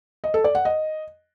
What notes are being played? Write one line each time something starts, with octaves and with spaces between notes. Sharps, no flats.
D#5
A4
D5
F#5
D#5